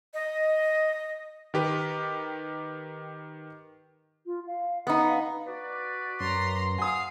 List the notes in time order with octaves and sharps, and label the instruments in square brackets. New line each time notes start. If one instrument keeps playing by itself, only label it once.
[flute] D#5
[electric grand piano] D#3 G4 B4
[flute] F4
F5
[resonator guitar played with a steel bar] B3 D#4 [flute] D#6
[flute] F5
[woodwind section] F#4 B4 D5
[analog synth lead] F#2 [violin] A#5 C6
[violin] F5 C7 [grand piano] F#5 D#6 [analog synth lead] G#5